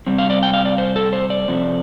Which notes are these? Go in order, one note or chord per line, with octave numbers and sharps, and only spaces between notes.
C3 G3 C4
F5
D5
G5
F5
D5
C5
A4
C5
D5
C3 F3 A3 C4